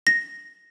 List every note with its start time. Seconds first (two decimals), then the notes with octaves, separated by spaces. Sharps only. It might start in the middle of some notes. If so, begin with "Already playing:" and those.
0.07 A#6